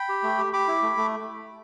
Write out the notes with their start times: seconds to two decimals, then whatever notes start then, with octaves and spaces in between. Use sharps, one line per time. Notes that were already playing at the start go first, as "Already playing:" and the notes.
Already playing: G5 B5
0.09 G4
0.23 A3
0.38 G4
0.53 G4 B5 D6
0.68 E4
0.83 A3
0.97 A3